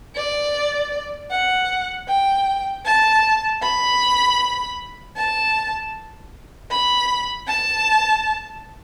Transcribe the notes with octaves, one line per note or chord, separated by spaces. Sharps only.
D5
F#5
G5
A5
B5
A5
B5
A5